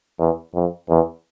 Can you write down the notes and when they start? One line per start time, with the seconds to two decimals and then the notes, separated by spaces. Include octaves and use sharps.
0.19 E2
0.55 F2
0.89 E2